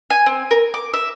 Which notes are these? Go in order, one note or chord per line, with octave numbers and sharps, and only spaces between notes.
G#5
C4
A#4
D6
E5